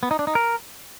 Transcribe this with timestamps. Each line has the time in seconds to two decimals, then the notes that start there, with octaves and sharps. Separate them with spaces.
0.03 B3
0.11 D#4
0.19 D4
0.27 D#4
0.35 A#4